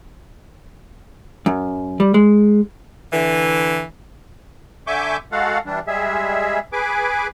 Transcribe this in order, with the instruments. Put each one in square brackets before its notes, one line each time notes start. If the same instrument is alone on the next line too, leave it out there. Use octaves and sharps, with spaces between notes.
[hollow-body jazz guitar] F#2
G3
G#3
[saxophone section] D3 E3
[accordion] D3 E5 G#5 C#6 D6 G6
G#3 F#4 A4 F5 F#5
E3 G3 D4
G3 G#3 G#4 E5
G#4 B4 G#5 D6